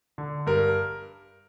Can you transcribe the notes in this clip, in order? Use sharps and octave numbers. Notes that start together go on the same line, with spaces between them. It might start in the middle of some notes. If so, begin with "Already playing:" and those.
D3
G2 A#4